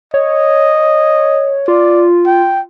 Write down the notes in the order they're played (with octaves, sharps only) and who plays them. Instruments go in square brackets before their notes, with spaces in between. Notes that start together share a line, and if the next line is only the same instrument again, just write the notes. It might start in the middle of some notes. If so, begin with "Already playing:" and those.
[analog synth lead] C#5 [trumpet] D#5
[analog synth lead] F4 [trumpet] D5
[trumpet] G5